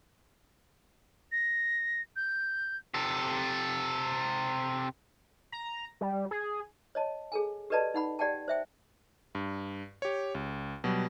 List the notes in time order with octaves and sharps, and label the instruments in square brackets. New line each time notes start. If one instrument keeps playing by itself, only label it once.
[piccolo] A#6
G6
[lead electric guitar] C3 A4
[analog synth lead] A#5
G3
G#4
[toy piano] C#5 D#5 A5
G#4 A4 G#5
G4 A4 B4 D5 D#5 A5
D#4 F#5 B5
G4 D5 F#5 G5 A5
C5 E5 G5
[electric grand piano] G2
G4 C#5
C#2
B2 F#3 G3